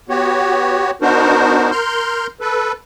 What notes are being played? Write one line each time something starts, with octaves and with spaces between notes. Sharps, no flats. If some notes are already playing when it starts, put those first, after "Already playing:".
B3 F#4 G4 C#5
B3 D4 D#4 F#4 A#4 C5
A#4 C6 F6 G6
A4 B4